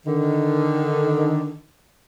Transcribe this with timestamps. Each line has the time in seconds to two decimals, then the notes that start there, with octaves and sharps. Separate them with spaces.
0.05 D3 D#3